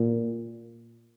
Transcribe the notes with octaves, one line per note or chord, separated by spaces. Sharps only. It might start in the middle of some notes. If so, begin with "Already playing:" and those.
Already playing: A#2